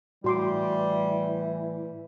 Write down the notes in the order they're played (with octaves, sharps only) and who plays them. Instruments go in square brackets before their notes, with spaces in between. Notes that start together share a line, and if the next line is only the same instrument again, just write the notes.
[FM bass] A2 [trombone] E3 [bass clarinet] G3 [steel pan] F#4 C6 D6